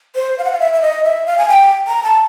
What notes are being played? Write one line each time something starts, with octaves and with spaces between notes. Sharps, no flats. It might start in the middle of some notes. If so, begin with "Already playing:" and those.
C5
F5
F#5
F5
E5
E5
D#5
E5
F5
G#5
G5
A#5
A5